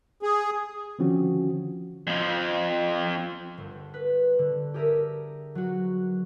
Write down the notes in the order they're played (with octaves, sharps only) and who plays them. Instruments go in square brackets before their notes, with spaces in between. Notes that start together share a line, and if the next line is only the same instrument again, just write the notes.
[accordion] G#4
[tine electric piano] D3 D#3 F3 C4 C#4 F#4
[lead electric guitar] F2 F3
[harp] G1
B4
D3
G4 G#4 A#4 E5
F#3 F#4